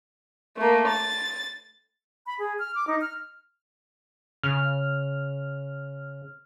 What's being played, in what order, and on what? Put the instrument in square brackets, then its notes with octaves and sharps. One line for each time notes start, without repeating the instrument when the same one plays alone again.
[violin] A3 A#3
A6
[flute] B5
G#4
F6
D6
D#4
F6
[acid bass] C#3 [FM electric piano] F6